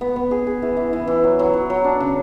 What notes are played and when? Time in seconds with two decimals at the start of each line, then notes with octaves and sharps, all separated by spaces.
0.01 B3
0.16 B3
0.31 G#4
0.47 G#4
0.62 E3
0.77 E3
0.93 E3
1.08 E3
1.24 F#3
1.39 F#3
1.54 F#3
1.70 F#3
1.84 D4
2.00 C#3